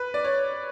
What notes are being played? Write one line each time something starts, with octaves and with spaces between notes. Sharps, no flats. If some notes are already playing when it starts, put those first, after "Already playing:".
Already playing: B4
D5
C#5